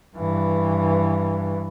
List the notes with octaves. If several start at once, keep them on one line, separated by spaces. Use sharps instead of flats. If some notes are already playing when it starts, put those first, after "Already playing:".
G2 E3